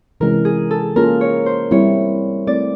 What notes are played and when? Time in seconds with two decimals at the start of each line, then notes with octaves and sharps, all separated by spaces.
0.20 C3 E3 G#3 C#4 A#4
0.45 G#4
0.71 A4
0.96 A#3 C#4 F4 G#4 A#4
1.21 C#5
1.46 C5
1.71 G3 C4 E4 C#5
2.47 A3 C4 E4 D5